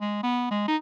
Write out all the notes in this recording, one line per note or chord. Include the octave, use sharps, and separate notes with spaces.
G#3
B3
G#3
D#4